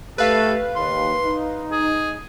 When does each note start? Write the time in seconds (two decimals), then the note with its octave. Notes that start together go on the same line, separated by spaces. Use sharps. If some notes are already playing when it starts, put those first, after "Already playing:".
0.18 A3 G4 A4 B4 F5
0.76 D#2 C6
1.25 D#4
1.72 G#4